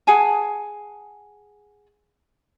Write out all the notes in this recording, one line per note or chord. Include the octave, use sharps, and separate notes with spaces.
G#4 F#5 G#5 A5